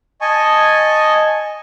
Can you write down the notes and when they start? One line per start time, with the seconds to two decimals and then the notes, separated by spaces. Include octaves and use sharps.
0.21 D#5 G#5 A5 C#6